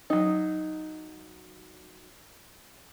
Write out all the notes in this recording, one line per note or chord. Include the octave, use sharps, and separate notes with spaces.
F#3 D#4